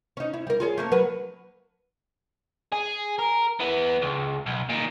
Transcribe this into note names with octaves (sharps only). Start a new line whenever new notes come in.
C#4 D#4
E4
G3 A#4
F4 G#4 C#5
A3 A#3 C#4
F#3 A#4 B4
G#4
A#4
E3 B3
C#2
B1
A#2 D#3